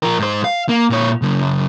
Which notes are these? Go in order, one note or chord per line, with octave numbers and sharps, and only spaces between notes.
F3 A#4
G#2 C5
F5
A#3
A#2 C#5
C#3 F#3